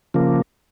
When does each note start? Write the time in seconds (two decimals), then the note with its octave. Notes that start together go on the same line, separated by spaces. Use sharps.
0.14 C#3 F3 A#3